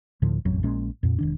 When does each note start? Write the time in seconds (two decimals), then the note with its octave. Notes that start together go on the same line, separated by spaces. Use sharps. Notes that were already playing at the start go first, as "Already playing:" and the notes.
0.22 D2 A2 D3 F3
0.45 E1 A1 F2 F#3
0.63 A#1 A#2 G#3 C#4
1.03 F2 A#2
1.19 E1 D#3 D4